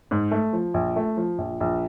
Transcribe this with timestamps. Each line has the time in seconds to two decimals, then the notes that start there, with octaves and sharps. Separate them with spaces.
0.11 G#2
0.31 A3
0.53 F3
0.74 A#1
0.96 A3
1.17 F3
1.38 A#1
1.60 A#1